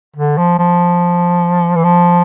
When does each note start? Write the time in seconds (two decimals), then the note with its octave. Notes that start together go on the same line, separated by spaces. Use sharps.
0.16 D3
0.38 F3
0.59 F3
1.76 E3
1.84 F3